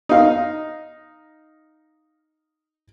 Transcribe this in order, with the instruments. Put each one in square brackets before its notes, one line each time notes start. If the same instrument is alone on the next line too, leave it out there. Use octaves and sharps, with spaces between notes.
[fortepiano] D#4 F5